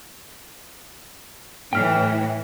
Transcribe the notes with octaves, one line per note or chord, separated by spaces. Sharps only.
A2 E3 G5 F6